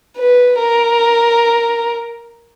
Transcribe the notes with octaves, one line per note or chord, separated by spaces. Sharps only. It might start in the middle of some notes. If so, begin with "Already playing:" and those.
B4
A#4